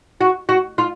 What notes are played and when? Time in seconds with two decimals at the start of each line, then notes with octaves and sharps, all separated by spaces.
0.21 F#4
0.49 F#4
0.78 F4